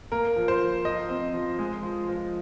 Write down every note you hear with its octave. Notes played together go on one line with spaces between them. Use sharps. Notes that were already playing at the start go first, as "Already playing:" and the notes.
A#3 A#4
F3
C5
F3
F3 D#5
C4
F3
G#3
F3
F3